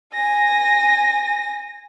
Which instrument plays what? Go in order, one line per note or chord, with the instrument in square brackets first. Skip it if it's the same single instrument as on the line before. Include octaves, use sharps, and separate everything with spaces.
[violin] G#5 A#6